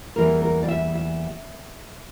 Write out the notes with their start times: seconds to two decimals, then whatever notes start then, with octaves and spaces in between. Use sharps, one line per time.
0.16 E2 E3 G3 A#3 A#4
0.42 A#4
0.63 D5
0.68 E5
0.95 E5